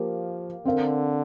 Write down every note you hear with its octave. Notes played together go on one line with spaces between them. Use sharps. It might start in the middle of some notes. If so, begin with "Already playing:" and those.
Already playing: F3 A#3 G4
D3 C4 A#4 F5